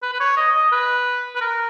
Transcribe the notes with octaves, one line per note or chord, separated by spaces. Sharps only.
B4
B4
C#5
D#5
D#5
B4
B4
A#4